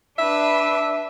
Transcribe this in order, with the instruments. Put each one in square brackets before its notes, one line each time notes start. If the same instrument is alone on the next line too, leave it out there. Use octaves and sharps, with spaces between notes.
[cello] D4 B4 [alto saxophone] E5